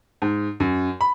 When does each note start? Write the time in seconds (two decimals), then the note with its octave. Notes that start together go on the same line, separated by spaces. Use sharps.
0.22 G#2
0.60 F#2
1.01 B5